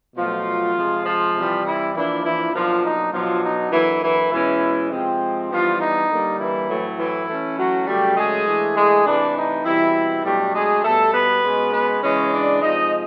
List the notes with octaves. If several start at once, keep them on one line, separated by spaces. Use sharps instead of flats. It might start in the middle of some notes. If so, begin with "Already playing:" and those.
B2 F3 F#3 A3 F4
C3 F3 G#3
F3 F4
C3 E3 G3
E3 E4
E3 F3 A#3 D4 E4
E3 E4
B2 F3 F#3 A#3 D4 F4
D#4
B2 F3 F#3 B3 D4 F4
D#4
D3 E3 F#3 A#3 E4
E3 E4
B2 E3 G#3 C#4 E4
C3 F3 G#3 C4
E3 F3 G3 B3 D4 F4
D#4
D3 G3 A#3
E3 E4
A2 F#3 A3 C4
E3 E4
E3 A3 C#4
F#3 F#4
C#3 F#3 G3 A3 G4
G#3 G#4
E3 A3 D4
G#3 G#4
C3 E3 A3 D4
D#4
B2 E3 G3 C4 E4
B2 F#3 G3 A3 D4 G4
G#3 G#4
B2 G3 A3 B3 A4
B3 B4
B2 G#3 C#4
B3 B4
C#3 E3 G#3 C#4 C#5
D4 D5
C3 F3 G#3 D#4 D#5